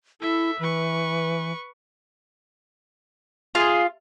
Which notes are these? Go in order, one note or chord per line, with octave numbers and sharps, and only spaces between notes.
E4 A4 E5
E3 B4 C#6
F4 G#4